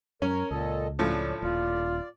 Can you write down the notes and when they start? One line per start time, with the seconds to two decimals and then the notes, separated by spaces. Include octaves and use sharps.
0.22 F#2 C#4 A#4 C#5
0.51 C#2 A#2 A4 D#5
0.99 A2 F3 A3 C#4 D4
1.42 D#1 F4 D5